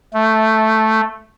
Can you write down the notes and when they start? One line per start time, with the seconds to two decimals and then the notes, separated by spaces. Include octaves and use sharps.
0.14 A3